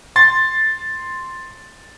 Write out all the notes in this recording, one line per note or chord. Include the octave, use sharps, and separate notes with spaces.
C6 A6